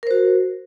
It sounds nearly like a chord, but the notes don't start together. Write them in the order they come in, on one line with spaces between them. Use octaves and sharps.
A#4 C5 F#4